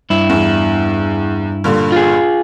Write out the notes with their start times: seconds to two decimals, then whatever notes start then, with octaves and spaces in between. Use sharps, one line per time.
0.10 G2 E4
0.30 E2
1.64 G2 A#2 D3
1.92 F4 G#4